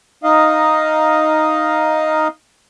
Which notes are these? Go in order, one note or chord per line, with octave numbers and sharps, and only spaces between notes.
D#4 D#5 F5